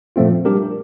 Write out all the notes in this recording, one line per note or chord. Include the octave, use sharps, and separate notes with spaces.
A#2 F3 A3 C4 F4
G3 D4 G4 A#4